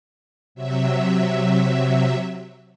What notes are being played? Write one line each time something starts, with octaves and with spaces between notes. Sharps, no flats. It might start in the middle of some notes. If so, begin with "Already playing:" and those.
C3 F#3 E5